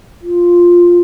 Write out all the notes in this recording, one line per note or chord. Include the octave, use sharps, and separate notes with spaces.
F4